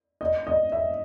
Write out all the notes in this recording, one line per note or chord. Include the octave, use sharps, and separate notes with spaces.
D#5
D#5
E5